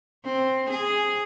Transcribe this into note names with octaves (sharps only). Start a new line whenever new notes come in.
C4
G#4